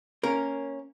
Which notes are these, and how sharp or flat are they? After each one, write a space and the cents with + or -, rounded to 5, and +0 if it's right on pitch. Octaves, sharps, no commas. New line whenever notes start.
A#3 -10 C#4 +0 A#4 +0